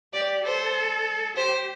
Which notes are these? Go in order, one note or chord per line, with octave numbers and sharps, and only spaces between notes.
G4 D5
A4 C5
G4 C5